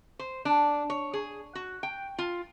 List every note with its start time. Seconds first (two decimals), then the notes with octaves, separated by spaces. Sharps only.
0.19 C5
0.45 D4
0.90 C#5
1.14 G#4
1.55 F#4
1.83 G5
2.18 F4